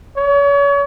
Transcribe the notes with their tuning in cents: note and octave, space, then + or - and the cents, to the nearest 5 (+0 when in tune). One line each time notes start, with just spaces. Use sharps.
C#5 +35